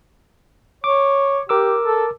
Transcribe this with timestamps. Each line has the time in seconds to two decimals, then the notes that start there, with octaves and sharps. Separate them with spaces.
0.84 C#5 D6
1.49 G4 A#4 D6 E6
1.85 A4